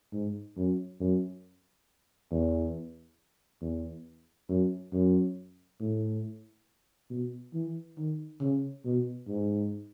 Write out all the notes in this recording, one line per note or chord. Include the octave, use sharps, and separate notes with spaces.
G#2
F#2
F#2
E2
E2
F#2
F#2
A2
B2
E3
D#3
C#3
B2
G#2